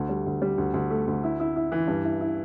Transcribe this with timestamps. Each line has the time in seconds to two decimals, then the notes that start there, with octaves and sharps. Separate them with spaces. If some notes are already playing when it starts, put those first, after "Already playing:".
Already playing: D2 A3
0.09 G3
0.26 D2
0.42 G3
0.58 D2
0.74 D2
0.90 A3
1.07 D2
1.24 E4
1.40 E4
1.56 E4
1.72 E3
1.88 G2
2.04 E4
2.21 E4